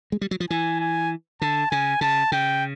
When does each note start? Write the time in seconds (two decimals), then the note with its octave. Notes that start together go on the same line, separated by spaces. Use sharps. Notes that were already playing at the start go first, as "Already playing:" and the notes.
0.12 G#3
0.21 G3
0.31 F#3
0.40 F3
0.50 E3 G#5
0.80 G#5
1.42 D3 A5
1.71 C#3 G#5
2.01 C#3 A5
2.32 C#3 G5